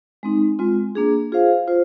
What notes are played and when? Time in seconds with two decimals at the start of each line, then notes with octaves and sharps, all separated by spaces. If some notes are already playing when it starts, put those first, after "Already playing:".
0.23 G#3 C4 D#4
0.59 G#3 C4 F4
0.95 A#3 D4 G#4
1.32 F4 G#4 C5 F5
1.68 F4 C5